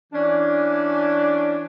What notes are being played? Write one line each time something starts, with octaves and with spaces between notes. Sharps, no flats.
E3 C#4 D4